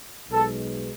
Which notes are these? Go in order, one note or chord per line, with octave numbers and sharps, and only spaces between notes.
B1 B2 G#3 A4